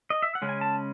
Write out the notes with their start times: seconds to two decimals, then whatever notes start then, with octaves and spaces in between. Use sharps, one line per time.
0.10 D#5
0.22 E5
0.35 F#5
0.42 C#3 G#3 C#4
0.49 G#5
0.61 A5